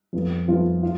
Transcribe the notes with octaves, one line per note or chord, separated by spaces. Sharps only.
F2 F3 B3 F4
F2 F3 B3 F4
F4